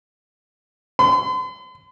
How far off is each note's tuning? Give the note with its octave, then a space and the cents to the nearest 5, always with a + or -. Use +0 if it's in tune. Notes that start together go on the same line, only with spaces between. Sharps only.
C6 -45